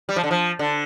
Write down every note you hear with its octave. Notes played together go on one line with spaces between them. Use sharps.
G3
F3
D3
F3
D3